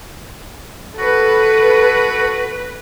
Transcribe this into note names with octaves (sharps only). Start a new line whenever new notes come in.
F#4 A4 B4